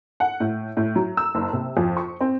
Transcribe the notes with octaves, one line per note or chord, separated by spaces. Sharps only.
F#5
A2
A2
F#3
E6
F#1
C3
F2
C#6
C4